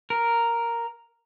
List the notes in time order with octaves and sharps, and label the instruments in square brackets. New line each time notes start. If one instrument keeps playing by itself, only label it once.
[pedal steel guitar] A#4